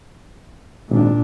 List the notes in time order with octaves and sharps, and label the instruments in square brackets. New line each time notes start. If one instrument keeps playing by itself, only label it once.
[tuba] G#1 [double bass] A#2 D4